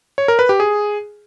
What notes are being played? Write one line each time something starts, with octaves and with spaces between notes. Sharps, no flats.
C#5
A#4
B4
G4
G#4